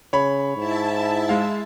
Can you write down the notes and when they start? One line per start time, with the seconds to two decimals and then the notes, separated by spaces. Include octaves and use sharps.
0.13 C#3 C#5 B5
0.56 G#2 E4 E5 A5
1.29 G#3 F5